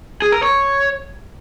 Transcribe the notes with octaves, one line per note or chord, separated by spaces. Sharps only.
G#4
A#4
C#5